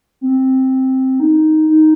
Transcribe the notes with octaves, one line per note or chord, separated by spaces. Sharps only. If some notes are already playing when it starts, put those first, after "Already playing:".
C4
D#4
D#4